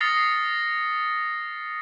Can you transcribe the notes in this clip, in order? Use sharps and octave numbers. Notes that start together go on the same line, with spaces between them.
D#6 F6 A6 A#6 C7 C#7